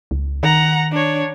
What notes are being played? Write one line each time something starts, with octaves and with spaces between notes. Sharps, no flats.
C#2
D#3 F#5 A#5
D4 C#5